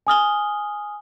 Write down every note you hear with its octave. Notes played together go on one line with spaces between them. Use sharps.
G#5 D#6 F6 G7